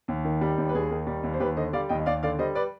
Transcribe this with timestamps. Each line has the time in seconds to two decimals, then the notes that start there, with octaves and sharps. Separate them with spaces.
0.08 D#2
0.25 D#3
0.41 G3
0.58 D#2
0.69 B4
0.74 D#2 G#4
0.91 D#3
1.07 G3
1.23 D#2
1.34 C5
1.40 D#2 G4 B4
1.57 D3 C5 D#5
1.73 G3 D5 F5
1.89 D#2 D#5 G5
2.00 D#5
2.06 D#2 D5 F5
2.23 D3 D5 F5
2.39 G3 C5 D#5
2.55 B4 D5